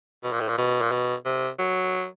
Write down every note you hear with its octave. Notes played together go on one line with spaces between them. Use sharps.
B2
A#2
A2
A#2
B2
A#2
B2
C3
F#3